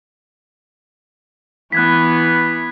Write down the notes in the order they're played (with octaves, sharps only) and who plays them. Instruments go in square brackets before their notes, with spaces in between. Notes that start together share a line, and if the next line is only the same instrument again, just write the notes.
[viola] E3 B3 [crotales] F#6 G#6 B6